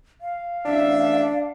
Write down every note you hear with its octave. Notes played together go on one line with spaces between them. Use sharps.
F5
A1 D2 D4 E5